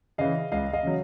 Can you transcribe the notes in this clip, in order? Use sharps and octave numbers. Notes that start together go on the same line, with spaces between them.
C#3 E3 D#5 F5
C#2 D#5 F5
D#5 F5
C#3 F#3